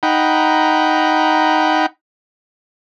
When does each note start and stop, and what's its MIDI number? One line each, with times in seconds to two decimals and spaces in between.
0.03 1.86 63
0.03 1.86 78
0.03 1.86 79
0.03 1.86 82
0.03 1.86 83